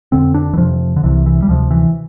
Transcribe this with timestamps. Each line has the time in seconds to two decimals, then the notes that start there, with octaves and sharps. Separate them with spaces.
0.12 F2 D3 C4
0.34 D4
0.53 E3
0.57 F2 C3 F3
0.96 D3
1.04 C2 C3 E3
1.26 E3
1.42 G3
1.48 D2 C3 F3
1.71 E3